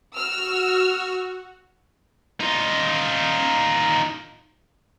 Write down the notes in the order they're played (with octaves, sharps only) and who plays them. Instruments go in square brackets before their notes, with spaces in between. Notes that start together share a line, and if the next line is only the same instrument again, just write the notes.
[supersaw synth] F#4 [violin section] E6 F6
[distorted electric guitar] D#4 F4